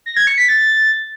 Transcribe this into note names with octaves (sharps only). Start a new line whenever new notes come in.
A#6
G#6
C#7
B6
A6